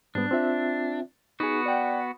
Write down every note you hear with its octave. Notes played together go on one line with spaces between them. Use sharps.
G#2 G3 B3 D4
C4 F4 E5
B3 D#4 F#4 G#4
D5 G5